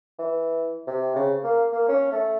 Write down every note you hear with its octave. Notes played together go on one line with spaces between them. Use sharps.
E3
C3
C#3
A#3
A#3
C#4
A3